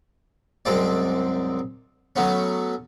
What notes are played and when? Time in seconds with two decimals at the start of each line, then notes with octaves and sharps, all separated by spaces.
0.65 C2 F#2 G#3 C4 D5
2.16 F#3 A3 B3 C#4